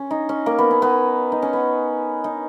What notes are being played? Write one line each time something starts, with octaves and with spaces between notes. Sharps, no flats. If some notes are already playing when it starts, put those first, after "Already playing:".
Already playing: C#4
D#4
C#4
A#3
B3
C#4
B3
D#4
C#4
B3
D#4